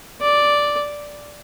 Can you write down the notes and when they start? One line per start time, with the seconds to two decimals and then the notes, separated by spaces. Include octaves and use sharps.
0.21 D5